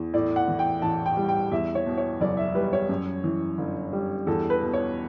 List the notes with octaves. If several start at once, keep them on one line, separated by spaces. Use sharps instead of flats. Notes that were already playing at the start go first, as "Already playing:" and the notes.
Already playing: E2
A2 D5
F#5
E3
G5
A1 A5
G5
G3
G5
E2 E5
C#5
B2
C#5
F#1 D5
E5
G3 B4
C#5
F#2
E3
G1
G3
E2 A4
B4
B2
C#5